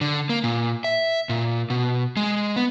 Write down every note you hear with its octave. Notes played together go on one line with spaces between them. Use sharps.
D3
A#3
A#2
E5
A#2
B2
G#3
B3